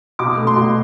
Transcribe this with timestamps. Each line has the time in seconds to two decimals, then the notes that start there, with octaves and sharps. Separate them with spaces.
0.19 B2 D6
0.37 A3
0.47 C6
0.56 B2